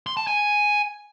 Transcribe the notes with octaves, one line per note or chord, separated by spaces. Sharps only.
C6
A5
G#5